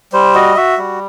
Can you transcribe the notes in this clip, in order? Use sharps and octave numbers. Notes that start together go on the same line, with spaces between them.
G3 C5
F#4 D#5
F#4 E5
G3